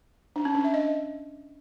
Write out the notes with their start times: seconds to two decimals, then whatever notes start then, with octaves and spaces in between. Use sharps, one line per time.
0.36 D4
0.45 C#4
0.55 D4
0.64 E5
0.74 D#5